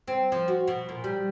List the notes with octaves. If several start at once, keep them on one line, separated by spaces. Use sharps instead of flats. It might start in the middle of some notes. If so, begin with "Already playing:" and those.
C4
F3
F#4
B2
A#2
G3